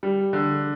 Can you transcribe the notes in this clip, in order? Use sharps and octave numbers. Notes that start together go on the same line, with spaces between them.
G3
D3